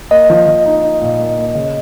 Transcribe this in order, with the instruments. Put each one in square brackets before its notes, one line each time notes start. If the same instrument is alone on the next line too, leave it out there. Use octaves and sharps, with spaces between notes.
[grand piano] A#3 [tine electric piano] D#5
[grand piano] F3
F3
D#4
D#4
A#2
A#3
A#3
C#3